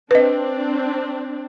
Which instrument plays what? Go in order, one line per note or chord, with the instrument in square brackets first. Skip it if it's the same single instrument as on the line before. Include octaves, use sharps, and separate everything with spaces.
[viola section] C4 D4 [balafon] B4 D#5